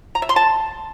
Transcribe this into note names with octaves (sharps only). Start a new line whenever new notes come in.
A#5
E5
C6
A5